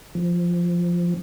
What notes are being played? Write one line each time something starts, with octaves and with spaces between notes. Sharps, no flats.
F3